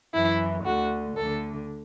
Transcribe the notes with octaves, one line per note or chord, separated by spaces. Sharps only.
F#2 E3 E4
D2 D3 F#4
D2 D3 A4